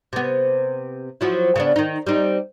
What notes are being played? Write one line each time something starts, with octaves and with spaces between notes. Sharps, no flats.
C3 B3
F3 F#3 E4
C#3 B3 D4
D#3 D#4
G3 C4 D#4